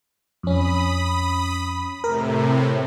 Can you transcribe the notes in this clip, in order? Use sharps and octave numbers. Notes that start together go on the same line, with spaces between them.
F2 C#4 B5 D#6
A2 C3 A#4